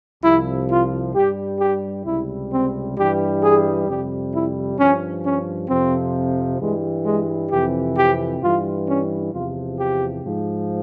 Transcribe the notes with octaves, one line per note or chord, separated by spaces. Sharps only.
C2 C3 F3 E4
F4
G2 G3 G4
G4
C#2 C3 G3 E4
C4
G2 E3 G3 G4
G#4
F2 C3 G3 G4
E4
G2 F3 C#4
C#4
F2 C3 F3 C4
G2 E3 G3 G#3
G#3
F2 C3 E3 G4
G4
G2 E3 G3 F4
C#4
E2 C3 F3 F4
G4
G#2 F3